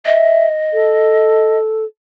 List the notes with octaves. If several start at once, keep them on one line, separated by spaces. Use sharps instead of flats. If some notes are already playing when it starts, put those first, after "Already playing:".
D#5 E5
A4